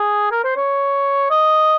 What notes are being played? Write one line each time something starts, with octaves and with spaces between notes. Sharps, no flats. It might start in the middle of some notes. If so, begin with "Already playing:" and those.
Already playing: G#4
A#4
C5
C#5
D#5